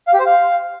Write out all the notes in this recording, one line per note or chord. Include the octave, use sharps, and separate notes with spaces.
F5
G4
C5
F5